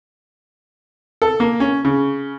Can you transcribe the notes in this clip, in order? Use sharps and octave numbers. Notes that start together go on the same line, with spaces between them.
A4
A#3
C#4
C#3